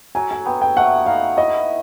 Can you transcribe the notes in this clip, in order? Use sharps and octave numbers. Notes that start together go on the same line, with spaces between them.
F#3 G#5
G#5
B3 G5
G5
A3 F#5
D#4 F5
E4 D#5